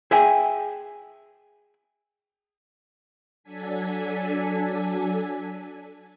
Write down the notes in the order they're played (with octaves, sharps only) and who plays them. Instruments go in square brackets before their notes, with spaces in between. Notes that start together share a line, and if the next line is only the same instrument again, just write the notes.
[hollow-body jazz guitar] G#4 E5 G5 G#5
[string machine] F#3 D4 A4 G#5 B6